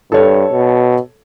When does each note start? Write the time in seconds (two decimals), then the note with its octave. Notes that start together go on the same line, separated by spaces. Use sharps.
0.12 G2 A4 C#5
0.51 B2